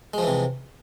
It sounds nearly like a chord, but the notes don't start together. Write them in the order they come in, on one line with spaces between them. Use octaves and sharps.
G#3 F3 E3 C3